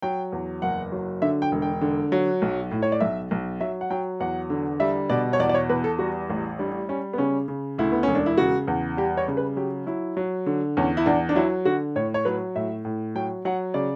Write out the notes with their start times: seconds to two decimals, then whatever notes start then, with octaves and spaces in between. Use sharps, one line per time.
0.02 F#3 G5
0.32 E2
0.62 F#1 F#5
0.92 F#3
1.22 D3 E5
1.42 G5
1.52 E1
1.62 G5
1.81 D3
2.12 F#3
2.42 B1
2.71 A2
2.82 C#5
2.92 D5
3.00 B1 E5
3.31 B1
3.60 F#3 E5
3.81 F#5
3.90 F#3 G5
4.20 E2 F#5
4.50 D3
4.80 G3 E5
5.10 B2 D5
5.33 C#5
5.39 E2 D5
5.49 D5
5.54 C#5
5.69 E2 B4
5.84 A4
5.99 G3 F#4
6.30 A1
6.59 G3 D4
6.89 G3 C#4
7.13 B3
7.18 C#3 C#4
7.48 C#3
7.78 D2 E4
7.92 B3
8.03 E1 C#4
8.15 D4
8.26 E4
8.38 C#3 F#4
8.67 E2
8.97 G3 G4
9.17 C#5
9.28 C#3
9.37 B4
9.57 F#3 G4
9.86 F#3 E4
10.17 F#3
10.46 D3
10.77 E2 C#4
10.97 E4
11.06 E2 D4
11.29 D4
11.36 F#3 E4
11.65 D3 F#4
11.96 A2 C#5
12.14 C#5
12.25 F#3 B4
12.56 A2 E5
12.85 A2
13.15 F#3 G5
13.45 F#3 F#5
13.74 C#3 D5